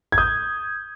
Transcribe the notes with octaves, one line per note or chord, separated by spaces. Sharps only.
G#6
D#6 G6